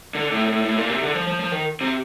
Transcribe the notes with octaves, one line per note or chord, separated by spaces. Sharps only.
D3
A2
A2
A2
A#2
C3
D3
F3
F3
F3
D#3
C3